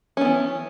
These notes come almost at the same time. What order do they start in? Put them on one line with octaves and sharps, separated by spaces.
C#4 B3 E3